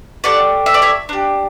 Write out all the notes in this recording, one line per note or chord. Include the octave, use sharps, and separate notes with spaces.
A3 D4 G4 D5 F#5
E5
D5
C#5 E5
D4 G4